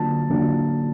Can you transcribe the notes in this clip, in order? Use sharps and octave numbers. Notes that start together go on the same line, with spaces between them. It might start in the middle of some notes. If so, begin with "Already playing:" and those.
Already playing: D3 F#3 A#3 D4 F4 A5
D3 F#3 A#3 D4 F4